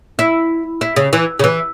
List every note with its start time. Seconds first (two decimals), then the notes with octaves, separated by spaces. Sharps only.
0.19 E4
0.81 E4
0.96 C#3
1.13 E3
1.39 C#3
1.44 E3